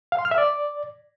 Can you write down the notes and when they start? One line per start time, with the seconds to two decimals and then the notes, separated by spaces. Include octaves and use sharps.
0.12 F5
0.19 C6
0.25 F6
0.31 E5
0.38 D5